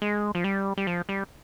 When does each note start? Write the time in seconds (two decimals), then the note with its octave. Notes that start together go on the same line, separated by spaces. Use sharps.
0.02 G#3
0.35 F3
0.44 G3
0.77 G3
0.87 F3
1.09 G3